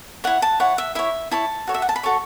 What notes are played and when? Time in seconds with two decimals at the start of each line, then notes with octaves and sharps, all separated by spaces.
0.24 E4 C#5 F#5
0.42 A5
0.60 E4 C#5 F#5
0.78 E5
0.95 E4 C#5 E5
1.31 E4 C#5 A5
1.67 F#4 A4 C#5
1.74 E5
1.82 F#5
1.89 A5
1.96 B5
2.03 F#4 A4 C#5 C#6